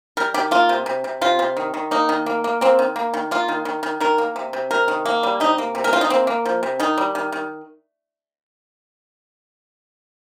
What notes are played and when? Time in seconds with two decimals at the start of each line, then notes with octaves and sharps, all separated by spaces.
0.17 G3 A#4
0.34 D#3 G4
0.51 A#3 F4
0.69 C3
0.86 C3
1.04 C3
1.21 C3 F4
1.39 C3
1.57 D#3
1.74 D#3
1.91 A#3 D#4
2.09 D#3
2.26 A#3
2.44 A#3
2.61 A#3 C4
2.79 D#3
2.96 A#3
3.14 D#3
3.31 A#3 F4
3.48 D#3
3.65 D#3
3.83 D#3
4.00 D#3 A#4
4.18 A#3
4.36 C3
4.53 C3
4.71 C3 A#4
4.88 D#3
5.06 A#3
5.23 G3
5.40 C3 D#4
5.58 A#3
5.75 C3
5.84 A#4
5.93 C3 F4
6.01 D#4
6.10 A#3 C4
6.27 A#3
6.45 F3
6.63 C3
6.80 D#3 D#4
6.98 G3
7.15 D#3
7.32 D#3